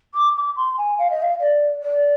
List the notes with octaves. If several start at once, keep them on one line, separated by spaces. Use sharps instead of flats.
D6
D6
C6
G#5
F5
D#5
F5
D5
D5